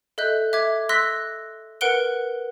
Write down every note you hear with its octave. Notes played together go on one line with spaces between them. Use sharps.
A4 D#5 E5 F#6 G6
E5 D6 G#6
C6 E6 F#6 A#6 B6
A#4 B4 F#5 F#6 D7 G7